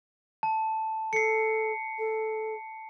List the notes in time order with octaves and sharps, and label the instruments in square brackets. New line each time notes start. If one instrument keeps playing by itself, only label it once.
[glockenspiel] A5
[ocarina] A4 [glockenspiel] C7 C#7
[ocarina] A4